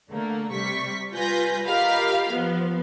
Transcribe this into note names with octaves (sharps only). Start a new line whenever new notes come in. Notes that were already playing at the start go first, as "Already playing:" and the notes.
D3 A3 A#3
C3 G3 C#6 B6
G3 F4 B4 G#5 G6 A#6
F4 G4 A#4 D#5 F5 B5
F3 B3